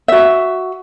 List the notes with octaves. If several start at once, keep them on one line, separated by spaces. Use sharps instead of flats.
F#4 E5